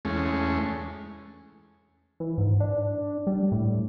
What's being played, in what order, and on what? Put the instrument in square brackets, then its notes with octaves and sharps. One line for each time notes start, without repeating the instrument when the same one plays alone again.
[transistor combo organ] E2 G#3 A3 C#4
[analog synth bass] E3
G#2
D4
G3
A2